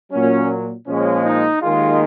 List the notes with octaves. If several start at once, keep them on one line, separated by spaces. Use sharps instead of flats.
A#2 F#3 C#4
A#2 F3 G#3 C#4
D#4
D#2 D#3 G#3 F4